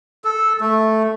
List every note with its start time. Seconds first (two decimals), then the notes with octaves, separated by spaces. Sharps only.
0.24 A4
0.61 A3